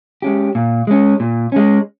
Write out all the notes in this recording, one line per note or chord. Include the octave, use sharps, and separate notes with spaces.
G#3 C#4 G4
A#2
G#3 C#4
A#2
G#3 C#4